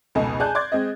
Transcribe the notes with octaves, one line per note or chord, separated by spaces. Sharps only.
F1 C#2 B2 A4 D#5 G#5
G#4 D5 G#5 A5 F#6 G6
D5 C6 D6 F#6 G#6 A6
G#3 C4 D#5